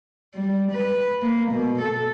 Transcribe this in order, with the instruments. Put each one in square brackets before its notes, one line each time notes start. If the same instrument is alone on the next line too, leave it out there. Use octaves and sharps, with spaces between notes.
[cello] G3
B4
A#3
B2
A4